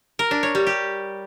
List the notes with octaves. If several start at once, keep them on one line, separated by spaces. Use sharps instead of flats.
A#4
D4
C#5
G3
G4